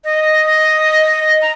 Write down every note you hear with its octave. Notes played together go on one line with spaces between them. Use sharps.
D#5
A#5